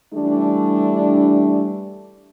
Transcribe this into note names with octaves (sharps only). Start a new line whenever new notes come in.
E3 G3 A3 D4